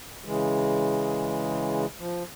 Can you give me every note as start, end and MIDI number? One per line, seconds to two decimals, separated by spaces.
0.25 1.86 49
0.25 1.86 52
0.25 1.86 56
1.98 2.23 53